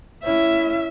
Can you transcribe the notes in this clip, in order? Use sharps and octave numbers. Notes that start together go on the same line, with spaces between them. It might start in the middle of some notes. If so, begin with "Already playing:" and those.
C#4 E4 E5